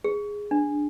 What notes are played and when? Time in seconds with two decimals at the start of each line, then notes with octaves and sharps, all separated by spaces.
0.04 G#4
0.51 D4